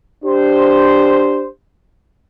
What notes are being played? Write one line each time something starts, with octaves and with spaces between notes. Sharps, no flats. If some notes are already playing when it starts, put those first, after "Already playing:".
D4 G4 C5